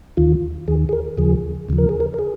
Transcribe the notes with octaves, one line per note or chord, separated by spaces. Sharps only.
D#2 D#3 F4
D#2 D#3 G#4
G#4
A#4
D#2 C#3 F3 G#4
D#2 C#3 F3
A#4
G#4
A#4
A#4
G#4